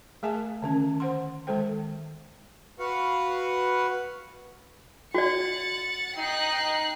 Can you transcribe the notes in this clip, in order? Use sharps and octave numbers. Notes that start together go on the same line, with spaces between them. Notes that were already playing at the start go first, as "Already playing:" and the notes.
A3 G#4 A#4 E5 G#5 A5
D3 D#3 C#4
C5 F#5 C6
D#3 G#3 A4 C5 G5
F#4 B4 F5 F#5
F#4 D5 F#5 A6
D#4 G5 F#6 C7